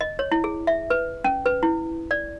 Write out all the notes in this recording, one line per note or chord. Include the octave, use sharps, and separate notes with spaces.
D#5
C#5
E4
G#4
E5
B4
C#4
B4
E4
D5